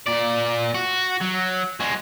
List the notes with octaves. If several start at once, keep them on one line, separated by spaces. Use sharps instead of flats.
A#2 D5
F#4
F#3
G#3 F#4